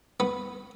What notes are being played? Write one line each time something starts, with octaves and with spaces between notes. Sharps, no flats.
B3